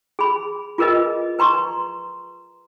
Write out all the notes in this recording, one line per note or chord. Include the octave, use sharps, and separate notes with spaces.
G#4 B5
F4 G#4 A#4 B4 D#5
B4 A#5 C6 C#6